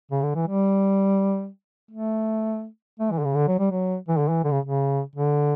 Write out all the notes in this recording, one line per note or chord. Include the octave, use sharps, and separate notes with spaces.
C#3
D3
E3
G3
A3
A3
E3
D3
C#3
D3
F#3
G3
F#3
E3
D3
E3
D3
C#3
C#3
D3